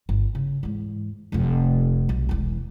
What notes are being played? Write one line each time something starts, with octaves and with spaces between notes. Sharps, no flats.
G1
C#3
E2 G#2
F1 F2
B1
E1 E2